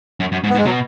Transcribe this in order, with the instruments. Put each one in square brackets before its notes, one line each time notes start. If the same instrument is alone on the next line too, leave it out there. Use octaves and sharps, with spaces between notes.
[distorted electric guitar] F#2
F#2
G#2
[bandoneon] B3
[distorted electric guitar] G#2
[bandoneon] G#3
[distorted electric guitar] B2 [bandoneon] F#3